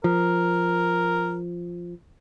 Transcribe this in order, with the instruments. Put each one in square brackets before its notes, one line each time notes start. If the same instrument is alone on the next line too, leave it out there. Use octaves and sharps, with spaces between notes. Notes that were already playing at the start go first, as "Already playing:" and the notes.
[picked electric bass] F3 [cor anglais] A#4